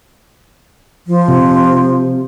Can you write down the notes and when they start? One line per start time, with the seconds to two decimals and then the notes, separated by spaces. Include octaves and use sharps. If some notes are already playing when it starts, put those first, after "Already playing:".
1.07 F3
1.28 C3